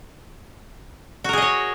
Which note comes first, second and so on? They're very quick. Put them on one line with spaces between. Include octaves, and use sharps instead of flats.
F#4 A#4 G#4 D#5 C#5